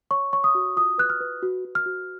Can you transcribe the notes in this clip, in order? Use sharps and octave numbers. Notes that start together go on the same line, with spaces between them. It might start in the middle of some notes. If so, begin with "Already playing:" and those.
C#5 C#6
C#5 C#6
D#6
F#4
F4 D#6
B4 F#6
F6
B4
F#4
F#4
F6
F#4